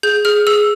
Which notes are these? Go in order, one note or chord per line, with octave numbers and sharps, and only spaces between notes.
G#4 G6
G#4 F6
G#4 E6